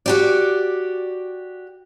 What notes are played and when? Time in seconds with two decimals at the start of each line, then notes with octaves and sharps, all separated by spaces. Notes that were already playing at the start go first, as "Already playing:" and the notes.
0.06 F#4 G4 D5